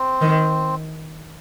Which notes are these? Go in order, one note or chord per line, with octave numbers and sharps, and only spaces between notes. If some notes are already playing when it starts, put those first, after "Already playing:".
Already playing: C4
D#3